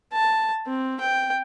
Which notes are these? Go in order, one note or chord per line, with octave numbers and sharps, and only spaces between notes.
A5
C4
G5